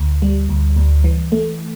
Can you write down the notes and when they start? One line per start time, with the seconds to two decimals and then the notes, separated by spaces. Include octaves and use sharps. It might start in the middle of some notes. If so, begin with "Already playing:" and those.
Already playing: D2
0.22 G3
0.49 D2
0.77 D2
1.04 E3
1.32 A3